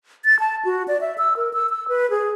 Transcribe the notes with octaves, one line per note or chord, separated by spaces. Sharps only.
A6
A5
F#4
D5
E5
E6
A#4
E6
E6
B4
G#4